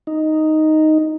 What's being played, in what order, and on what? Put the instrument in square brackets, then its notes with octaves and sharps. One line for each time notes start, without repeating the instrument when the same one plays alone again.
[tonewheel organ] D#4